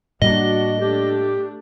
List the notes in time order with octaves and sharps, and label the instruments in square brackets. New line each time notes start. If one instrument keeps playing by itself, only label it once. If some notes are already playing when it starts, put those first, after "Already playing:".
[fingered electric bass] A2 G3 A#3 [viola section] D4 F#4 [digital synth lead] D#5
[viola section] A3 D4 [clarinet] G4